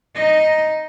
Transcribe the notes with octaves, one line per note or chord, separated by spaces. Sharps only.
D#4 D#5